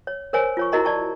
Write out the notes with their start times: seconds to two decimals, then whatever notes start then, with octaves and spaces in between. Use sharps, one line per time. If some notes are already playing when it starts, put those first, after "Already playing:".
0.07 C#5
0.33 A#4 C5 C#5 G#5
0.57 F4 C#5 C#6
0.72 E4 F#4 A#4 D#5 A#5 C6
0.85 D5 A5 C#6